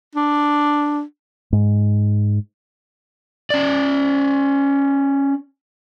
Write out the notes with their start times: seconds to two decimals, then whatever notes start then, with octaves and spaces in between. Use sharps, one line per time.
0.16 D4
1.53 G#2
3.50 C#4 D5